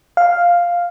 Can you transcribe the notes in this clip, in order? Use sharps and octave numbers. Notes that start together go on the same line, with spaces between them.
F5